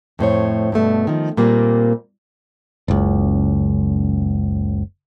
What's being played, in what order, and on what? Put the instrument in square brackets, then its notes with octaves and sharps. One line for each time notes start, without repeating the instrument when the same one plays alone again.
[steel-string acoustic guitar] F2 A2 C5 C#5
G2 B2 A3
D#3 F3
A#2 G3 A#3 C4
[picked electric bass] F#1 C#2